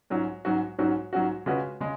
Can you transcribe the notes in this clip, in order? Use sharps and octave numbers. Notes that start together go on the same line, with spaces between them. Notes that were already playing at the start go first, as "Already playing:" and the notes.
G#2 F#3 C#4 F#4
G#2 F#3 C#4 F#4
G#2 F#3 C#4 F#4
G#2 F#3 C#4 F#4
C#3 G#3 C#4 F#4 B4
C#3 G#3